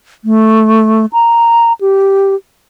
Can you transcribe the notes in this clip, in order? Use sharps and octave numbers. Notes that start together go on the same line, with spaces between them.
A3
A#5
G4